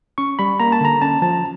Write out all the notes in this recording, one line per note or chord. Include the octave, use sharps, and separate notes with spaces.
C#4 C#6
G3 B5
A#3 A#5
A5
D3 A#5
C#4 A5
F3 A5